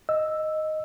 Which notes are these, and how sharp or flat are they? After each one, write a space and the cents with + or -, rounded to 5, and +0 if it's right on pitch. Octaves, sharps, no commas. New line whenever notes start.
D#5 +0 E6 +0